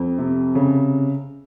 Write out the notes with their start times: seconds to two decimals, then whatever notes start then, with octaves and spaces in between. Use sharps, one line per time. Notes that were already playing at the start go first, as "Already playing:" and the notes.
Already playing: F2
0.18 C3
0.55 C#3